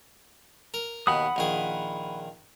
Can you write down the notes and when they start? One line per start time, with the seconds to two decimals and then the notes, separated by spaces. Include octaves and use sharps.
0.74 A#4
1.07 D#2 B2 F#5 B5 D#6
1.36 A#1 D#3 G#4